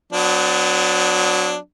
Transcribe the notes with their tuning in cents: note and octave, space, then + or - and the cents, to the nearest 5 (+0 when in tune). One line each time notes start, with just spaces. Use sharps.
F#3 -20 B3 +40 D4 +0